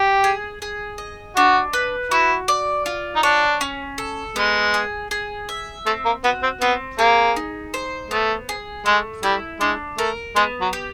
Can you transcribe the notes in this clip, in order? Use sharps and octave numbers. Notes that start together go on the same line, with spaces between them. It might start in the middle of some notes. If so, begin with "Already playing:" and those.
Already playing: G4
G#4
G#4
D#5
D4 F#4
B4
E4 F#4
D5
F4
D#4
D4 C#5
C#4
A4
G#3 B3
G#4
G#4
E5
A3 C4
A#3
B3 F#4
C4
B3 C4
A#3 G#4
D#4
C5
A3 B3
G#4
G#3 A3
G3 E4
G#3 D4
A3 A#4
G#3 B3
F#3
G4